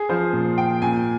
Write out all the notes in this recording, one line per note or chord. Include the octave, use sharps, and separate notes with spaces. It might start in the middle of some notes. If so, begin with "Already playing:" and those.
Already playing: G#4
F3 C5
A#2
F3 G5
A#2 G#5